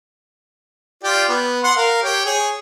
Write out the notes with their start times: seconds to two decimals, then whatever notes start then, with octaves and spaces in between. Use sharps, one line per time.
1.03 F4 G4 D5
1.29 B3
1.63 F#5 C6
1.76 A#4 F5
2.03 G4 C#5
2.26 G#4 C#5